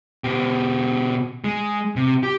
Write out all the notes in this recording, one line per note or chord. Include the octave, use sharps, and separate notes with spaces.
B2 G4
G#3
C3
G4